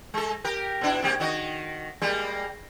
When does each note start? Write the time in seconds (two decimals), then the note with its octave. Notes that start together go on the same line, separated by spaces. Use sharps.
0.14 G#3 A4
0.44 G4 A#4
0.81 B2 D4 E4
1.02 C3 A#3 G4
1.20 D#3 F#4 D#5
2.02 G3 G#3 A#3